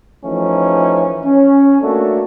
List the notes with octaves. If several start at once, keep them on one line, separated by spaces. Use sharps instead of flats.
E3 F3 A3 C#4 D#4
C#4
A3 A#3 D4 F#4 A4